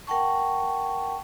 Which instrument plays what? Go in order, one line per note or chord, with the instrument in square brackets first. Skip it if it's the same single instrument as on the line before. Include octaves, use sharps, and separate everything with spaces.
[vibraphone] A#4 F#5 G5 A5 C#6